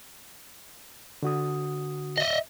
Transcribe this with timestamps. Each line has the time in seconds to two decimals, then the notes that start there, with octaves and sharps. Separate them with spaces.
1.23 D3 F#4 D#6
2.18 D#5 E5